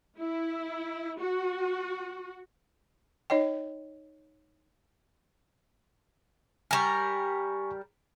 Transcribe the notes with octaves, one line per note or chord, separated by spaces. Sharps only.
E4
F#4
D#4 C#5 D#5 G5
G3 A#4 G#5 A#5 C#6